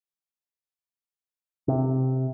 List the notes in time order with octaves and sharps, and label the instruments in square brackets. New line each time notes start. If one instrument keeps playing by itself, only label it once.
[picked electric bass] C3